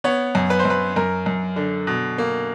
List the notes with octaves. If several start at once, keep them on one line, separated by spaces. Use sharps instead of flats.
B3 C#5
F#2
B4
C5
F#2
B4
F#2 A#4
F#2
D3
B2
A#3